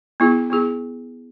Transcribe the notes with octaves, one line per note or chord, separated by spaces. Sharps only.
B3 E4 G#4
B3 E4 G#4